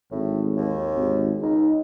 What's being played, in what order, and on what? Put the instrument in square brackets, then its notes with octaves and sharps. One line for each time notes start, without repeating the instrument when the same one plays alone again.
[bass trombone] G#1 [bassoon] A2
[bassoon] D#2
[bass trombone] G#1
[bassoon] C#2 [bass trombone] D#4